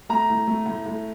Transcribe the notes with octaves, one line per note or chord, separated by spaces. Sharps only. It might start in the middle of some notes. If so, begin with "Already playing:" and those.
A3 A#5
A2
A3
A2
A2